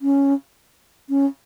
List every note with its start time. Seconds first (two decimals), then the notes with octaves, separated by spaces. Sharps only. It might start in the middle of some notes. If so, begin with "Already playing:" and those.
0.02 C#4
1.09 C#4